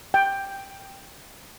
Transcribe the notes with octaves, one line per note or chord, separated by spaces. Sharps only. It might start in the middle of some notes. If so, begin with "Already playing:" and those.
G5